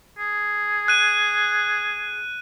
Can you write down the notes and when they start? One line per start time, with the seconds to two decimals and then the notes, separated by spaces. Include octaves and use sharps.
0.19 G#4
0.88 F#6 D#7